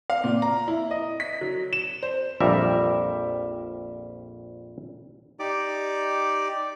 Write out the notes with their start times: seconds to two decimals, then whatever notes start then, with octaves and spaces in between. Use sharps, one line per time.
0.10 F5
0.24 A#2
0.42 A#5
0.68 E4
0.91 D#5
1.20 B6
1.41 F#3
1.73 E7
2.03 C5
2.40 A#1 F2 G3 A#4 E5
5.39 D#4 G4 D5 D6